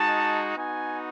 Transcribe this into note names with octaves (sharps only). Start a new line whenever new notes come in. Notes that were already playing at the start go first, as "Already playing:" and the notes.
Already playing: G#3 D#4 F#4 A5
B3 D#4 F#4 G#5